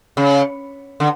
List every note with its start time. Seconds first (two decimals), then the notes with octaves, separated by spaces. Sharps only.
0.17 C#3
1.00 D3